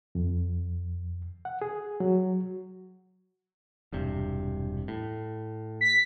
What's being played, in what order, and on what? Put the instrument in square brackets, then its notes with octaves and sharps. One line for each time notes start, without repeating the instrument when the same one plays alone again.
[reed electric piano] F2
F#5
G#4
F#3
[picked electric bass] E1 G2 C3
A2
[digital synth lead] B6